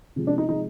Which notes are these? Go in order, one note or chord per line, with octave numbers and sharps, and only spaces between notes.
C3 F3 G#3
D4
D#4
C3 F3 G#3 D#4